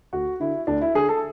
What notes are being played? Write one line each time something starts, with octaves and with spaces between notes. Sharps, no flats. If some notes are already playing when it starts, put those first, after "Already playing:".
D2 F#4
D3 E4
D2 D4
E4
D3 G#4
A4